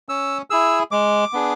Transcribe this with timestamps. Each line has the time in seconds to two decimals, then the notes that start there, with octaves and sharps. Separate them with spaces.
0.09 C#4 E6
0.50 E4 G#4 E6
0.91 G#3 D6
1.33 B3 D4 G#4